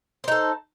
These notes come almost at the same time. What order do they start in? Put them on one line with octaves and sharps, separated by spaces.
C5 D#4 A4